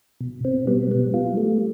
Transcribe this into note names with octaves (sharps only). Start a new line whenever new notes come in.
B2
B2 C4
G3 B3
G3 B3
G3 F4
G3 A3